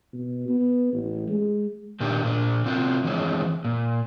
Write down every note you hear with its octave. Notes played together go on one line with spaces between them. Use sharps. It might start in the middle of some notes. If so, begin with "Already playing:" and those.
B2
B3
A1
G#3
A#2 D3 D#3 D4 G4
A#2 D4
C3 C4 F4 F#4
D3 E3 F3 G#3 C4 C#4
A#2